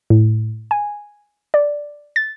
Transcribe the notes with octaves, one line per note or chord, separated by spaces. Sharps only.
A2
G#5
D5
A6